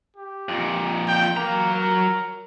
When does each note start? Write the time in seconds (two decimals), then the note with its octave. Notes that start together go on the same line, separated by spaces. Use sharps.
0.17 G4
0.49 F2 A#2
1.08 G5
1.37 F#3 A#3 A#5
1.73 A#4